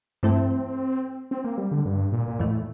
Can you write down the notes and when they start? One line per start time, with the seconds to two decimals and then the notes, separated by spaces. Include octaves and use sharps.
0.23 G2 E3 A3 C4 E4 A4
1.31 C4
1.44 A#3
1.58 G3
1.72 D3
1.85 G2
2.12 A#2
2.28 A#2
2.39 F2 A2 E3 A3